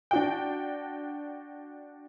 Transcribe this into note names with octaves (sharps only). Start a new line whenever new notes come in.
D4 F#4 G5